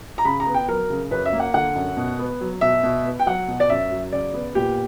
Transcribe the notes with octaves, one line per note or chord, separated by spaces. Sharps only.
A#5
C#3 B5
A#5
B3
G5
F#3 A#4
C#3
F#2 B4
E5
A#3
F#5
D3 F#5
F#2
B2
B3
F#3
B2 E5
B2
B3
G5
F#3 F#5
B2
D5
F#2 E5
F#3
C#3 D5
B3
A#2 G4